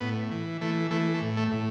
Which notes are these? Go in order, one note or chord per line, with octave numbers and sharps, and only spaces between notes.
A2 B3
E3
E3 A3
E3 A3
A3
A2
A3
A2